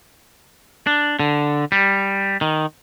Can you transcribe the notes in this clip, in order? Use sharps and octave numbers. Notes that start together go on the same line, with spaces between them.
D4
D3
G3
D#3